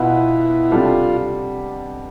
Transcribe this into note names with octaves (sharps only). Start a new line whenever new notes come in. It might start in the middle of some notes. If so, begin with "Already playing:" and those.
Already playing: B2 B3 E4 F4 B4
C3 G3 D4 F4 A4